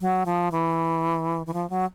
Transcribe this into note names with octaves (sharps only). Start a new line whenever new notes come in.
F#3
F3
E3
E3
F3
F#3